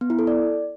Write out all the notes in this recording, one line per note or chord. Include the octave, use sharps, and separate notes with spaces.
B3
E4
A4
D5